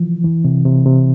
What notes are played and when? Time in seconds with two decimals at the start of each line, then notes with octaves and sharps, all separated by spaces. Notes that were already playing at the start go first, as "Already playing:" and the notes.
Already playing: E3 F3
0.24 E3
0.45 C3
0.65 C3
0.86 C3